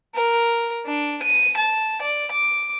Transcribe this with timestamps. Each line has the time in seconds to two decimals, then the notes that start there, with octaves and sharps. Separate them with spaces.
0.16 A#4
0.86 D4
1.23 D#7
1.57 A5
2.02 D5
2.32 D6